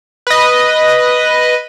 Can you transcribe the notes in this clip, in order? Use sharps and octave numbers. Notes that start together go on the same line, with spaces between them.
B4 D#5